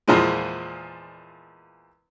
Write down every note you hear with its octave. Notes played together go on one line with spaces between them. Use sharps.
E2 A#2 F3 G#3